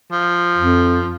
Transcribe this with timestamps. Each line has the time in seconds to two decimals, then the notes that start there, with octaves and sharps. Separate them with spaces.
0.12 F3
0.57 F2